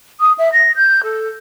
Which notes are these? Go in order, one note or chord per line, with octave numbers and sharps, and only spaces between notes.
D#6
E5
A#6
G6
A4